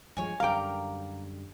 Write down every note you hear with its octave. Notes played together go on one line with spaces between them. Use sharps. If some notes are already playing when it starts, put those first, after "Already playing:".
G2 F3 G#3 C#5 G#5
F#2 D3 G3 A#4 F5 G5 D6